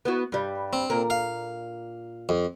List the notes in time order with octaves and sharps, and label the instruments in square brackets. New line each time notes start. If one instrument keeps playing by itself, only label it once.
[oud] B3 E4 F#4
G2 G3
[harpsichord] C4
[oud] A#2 A#4
[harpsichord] F5
F2